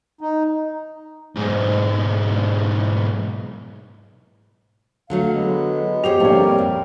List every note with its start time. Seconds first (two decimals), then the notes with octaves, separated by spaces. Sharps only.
0.21 D#4
1.36 B1 G#2
5.10 D3 F#3 A3 F5
5.30 G#3 B3
6.04 G4 G#4 C5 C#5 F7
6.20 A#1 D3 G3 C4 F4 A#4 C#5
6.59 F2